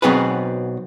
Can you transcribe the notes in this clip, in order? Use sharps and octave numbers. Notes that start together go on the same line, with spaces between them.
B1 F#3 B3 C4 G#4 B4